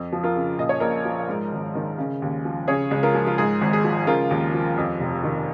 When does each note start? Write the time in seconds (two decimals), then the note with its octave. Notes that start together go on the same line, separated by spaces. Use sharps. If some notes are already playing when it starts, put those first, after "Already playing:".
Already playing: F2
0.13 F3
0.23 F4 A#4
0.35 C#3
0.58 A#2 D#5
0.69 C#5
0.80 A#1 A#4 D#5
1.05 F3
1.29 G#2
1.52 G#1
1.75 D#3
1.98 C#3
2.22 D#2
2.45 F3
2.68 C#3 G#4 C#5
2.91 C#2
3.03 F4 A#4
3.15 F3
3.27 F4
3.38 G#2 G#4
3.62 G#1
3.73 G#4
3.84 F3
4.07 C#3 F4 A#4
4.31 D#2
4.54 F3
4.77 F2
5.00 F1
5.24 D#3